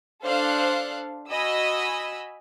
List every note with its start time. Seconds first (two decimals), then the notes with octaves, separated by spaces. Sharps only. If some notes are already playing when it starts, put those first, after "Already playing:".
0.24 D4 A4 C5 F5 F#6
1.32 F#4 D#5 G#5 B5 E6